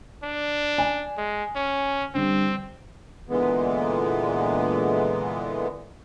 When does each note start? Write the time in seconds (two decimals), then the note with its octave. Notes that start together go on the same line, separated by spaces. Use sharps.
0.23 D4
0.78 G#5
1.17 G#3
1.56 C#4
2.15 D3 G3 C4
3.29 A#2 D3 E3 G#3 B3